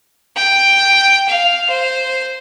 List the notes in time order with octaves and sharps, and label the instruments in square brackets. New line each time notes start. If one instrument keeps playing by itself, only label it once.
[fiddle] G5
F5
C5